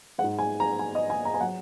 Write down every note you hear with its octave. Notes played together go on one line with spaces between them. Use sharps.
G#3 F#5
G#2
G#5
A#5
G#5
D#5
G#5
A#5
G#5
F#3 F#5